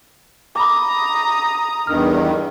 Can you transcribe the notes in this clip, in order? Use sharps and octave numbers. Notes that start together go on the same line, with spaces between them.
A#5 B5 D6 D#6
E2 G2 D#3 F6